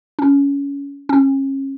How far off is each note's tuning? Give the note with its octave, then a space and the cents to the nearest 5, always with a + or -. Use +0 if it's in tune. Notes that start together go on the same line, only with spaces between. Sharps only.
C#4 +20
C#4 -35